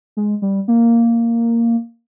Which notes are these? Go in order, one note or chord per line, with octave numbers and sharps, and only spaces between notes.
G#3
G3
A#3